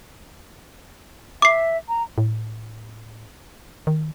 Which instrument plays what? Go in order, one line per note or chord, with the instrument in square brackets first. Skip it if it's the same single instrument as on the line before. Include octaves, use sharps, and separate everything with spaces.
[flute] E5 [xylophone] D6 C7
[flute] A#5
[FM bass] A2
D#3